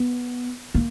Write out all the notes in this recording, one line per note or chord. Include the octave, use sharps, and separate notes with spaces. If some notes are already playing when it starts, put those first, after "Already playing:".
Already playing: B3
A#3